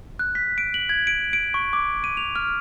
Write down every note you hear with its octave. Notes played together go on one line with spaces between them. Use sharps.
F#6
B6
D7
F#7
G#6
D7
D7
C#6
D6
D#7
F7
F6